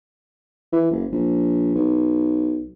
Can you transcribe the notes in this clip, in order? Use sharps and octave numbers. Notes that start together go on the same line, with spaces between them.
E3
F#1
A#1
B1